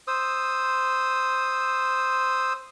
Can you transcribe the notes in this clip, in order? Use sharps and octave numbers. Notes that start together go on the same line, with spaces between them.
C5 D#6 E6